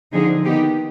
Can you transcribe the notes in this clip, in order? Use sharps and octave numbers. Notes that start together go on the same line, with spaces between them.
D3 F3 C4 D#4 G#4
D#3 B3 D#4 G4